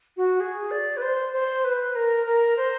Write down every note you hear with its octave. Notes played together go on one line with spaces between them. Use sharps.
F#4
G#4
D5
B4
C5
C5
B4
A#4
A#4
C5